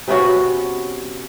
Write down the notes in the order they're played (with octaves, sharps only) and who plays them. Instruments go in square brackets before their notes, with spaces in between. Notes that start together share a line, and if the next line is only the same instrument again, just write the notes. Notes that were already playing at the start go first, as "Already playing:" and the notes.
[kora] C3 B3 C#4 F#4